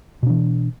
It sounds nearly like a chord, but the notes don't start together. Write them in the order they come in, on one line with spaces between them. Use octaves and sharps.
B2 D4 E3